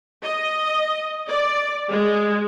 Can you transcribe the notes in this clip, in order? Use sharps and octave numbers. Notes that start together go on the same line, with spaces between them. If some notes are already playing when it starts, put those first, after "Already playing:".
D#5
D5
G#3